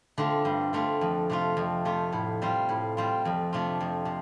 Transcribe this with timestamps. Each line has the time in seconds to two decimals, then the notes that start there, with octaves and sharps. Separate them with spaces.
0.18 D3 A3 C4 F4
0.45 G2
0.73 D3 A3 C4 F4
1.01 F2
1.30 C3 A3 F4
1.57 F2
1.85 C3 A3 F4
2.13 A2
2.42 G3 C4 F4
2.69 A2
2.97 G3 C4 F4
3.25 F2
3.53 C3 A3 D4 F4
3.80 F2
4.05 C3